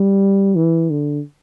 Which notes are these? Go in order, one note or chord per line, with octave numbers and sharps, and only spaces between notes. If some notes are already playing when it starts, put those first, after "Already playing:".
Already playing: G3
E3
D3